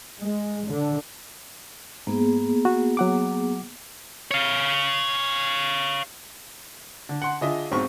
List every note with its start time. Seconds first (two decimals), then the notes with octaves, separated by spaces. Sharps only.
0.22 G#3
0.68 D3
2.07 G#2 A#3 B3 G#4
2.65 F#4
2.97 F#3 F#5 D6
4.31 C#5 F5
7.09 D3
7.22 F#5 C6
7.41 D3 F4 G#4 D#5 E5
7.71 B1 G#2 C4 C#6